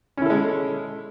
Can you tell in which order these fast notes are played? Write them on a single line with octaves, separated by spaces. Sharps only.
C#4 E4 A4 G#3